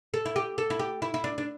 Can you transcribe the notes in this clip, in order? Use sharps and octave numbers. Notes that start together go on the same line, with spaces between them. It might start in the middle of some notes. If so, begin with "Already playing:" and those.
A4
E4
G4
A4
E4
G4
E4
E4
D4
D4